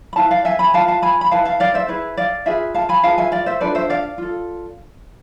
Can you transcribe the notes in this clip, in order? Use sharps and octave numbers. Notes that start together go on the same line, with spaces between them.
B5
E4 B4 F5 A5
D5 F5
E5 G#5
G#5 B5
F4 G#4 B4 F5 A5
F5 A5
G#5 B5
B5
E4 B4 F5 A5
F5 A5
D5 F5
C5 E5
E4 G#4 B4
D5 F5
F4 G#4 B4 E5 G#5
F5 A5
G#5 B5
F4 G#4 B4 F5 A5
E5 G#5
D5 F5
C5 E5
D4 F4 A4 B4 D5
C5 E5
D5 F5
F4 A4